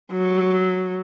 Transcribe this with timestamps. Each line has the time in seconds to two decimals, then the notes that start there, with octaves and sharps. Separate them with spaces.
0.12 F#3